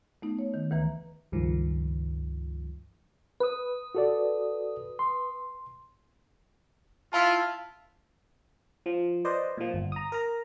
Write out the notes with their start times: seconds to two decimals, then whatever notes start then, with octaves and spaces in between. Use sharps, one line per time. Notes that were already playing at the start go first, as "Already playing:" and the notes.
0.22 A3 B3 D#4
0.39 C#5
0.54 D#3
0.71 D2 D#3 E3 B4 A#5
1.32 C#2 G2 D#3 F3
3.40 B4 D#6
3.95 F#4 A4 D5
4.99 C6
7.13 E4 F4 F5 A5
8.86 F3
9.25 B4 C5 D5 D#5
9.58 A#2 F3
9.74 G1
9.92 A#5 D#6
10.12 A#4 A#5